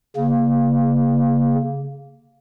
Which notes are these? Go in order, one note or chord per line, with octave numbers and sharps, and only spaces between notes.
C#3 A#3